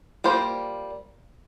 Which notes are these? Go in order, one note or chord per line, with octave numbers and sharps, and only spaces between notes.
G3 A#3 F4 C5